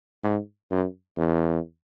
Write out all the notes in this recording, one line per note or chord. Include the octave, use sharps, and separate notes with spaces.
G#2
F#2
E2